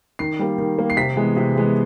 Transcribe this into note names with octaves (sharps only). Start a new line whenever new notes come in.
D#3 C7
G3 A#3
D#3
G3 A#3
C7
C3 B6
E3 G#3 B3
C3
E3 G#3 B3